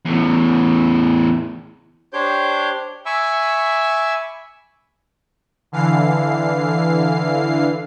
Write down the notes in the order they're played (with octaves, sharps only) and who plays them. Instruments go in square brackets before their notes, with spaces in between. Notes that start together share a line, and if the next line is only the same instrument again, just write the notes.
[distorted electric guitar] E2 A2
[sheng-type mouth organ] D4 G4 C5 C#5 D6 G6
E5 G#5 B5 C#6 D6 E6
[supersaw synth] D3 E3 F5 C7